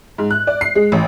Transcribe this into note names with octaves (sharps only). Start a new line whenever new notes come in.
G#2
F#6
D5
C7
G#3
A1